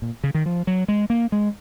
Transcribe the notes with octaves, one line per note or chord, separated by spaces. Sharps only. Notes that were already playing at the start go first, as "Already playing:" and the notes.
A#2
C#3
D#3
F3
F#3
G#3
A#3
G#3